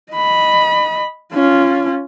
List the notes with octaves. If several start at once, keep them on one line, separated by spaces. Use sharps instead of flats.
D#5 B5
C#4 F4